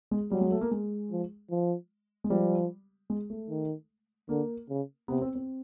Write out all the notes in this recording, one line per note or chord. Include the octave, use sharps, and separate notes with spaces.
G#3
F#3 G3
G#3
A3
A#3
G#3
F3
F3
G#3
F3 G3
G#3
A3
D#3
D3 A#3
C#3
C3 B3
C4
C4